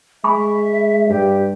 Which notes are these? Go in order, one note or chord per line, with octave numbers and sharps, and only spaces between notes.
G#3 E5 G#5 B5 C#6
G2 G4